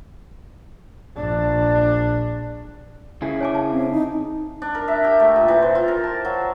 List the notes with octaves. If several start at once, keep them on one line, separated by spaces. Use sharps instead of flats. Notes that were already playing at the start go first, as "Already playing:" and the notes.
A#1 D4
C#3 E4 G#4
C#5 G#5 D6
F5 A5
C4
D#4
D4
A#4
E5
G4
A3
A#2
E3
C5
F4
A#4
A5
F#3